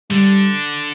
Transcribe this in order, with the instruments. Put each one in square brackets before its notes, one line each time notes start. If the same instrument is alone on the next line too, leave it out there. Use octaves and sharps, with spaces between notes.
[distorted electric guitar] D3 [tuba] G3